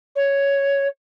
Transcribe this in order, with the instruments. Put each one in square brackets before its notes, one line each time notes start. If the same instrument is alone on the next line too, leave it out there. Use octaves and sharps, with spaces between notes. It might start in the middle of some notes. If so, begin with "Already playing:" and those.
[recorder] C#5